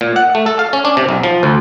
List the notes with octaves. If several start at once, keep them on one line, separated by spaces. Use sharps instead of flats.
A#2
F#5
A3
A4
F5
C#4
D4
C3
B1
F3
D2